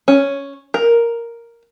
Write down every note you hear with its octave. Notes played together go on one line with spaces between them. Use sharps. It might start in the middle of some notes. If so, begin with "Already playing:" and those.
C#4
A#4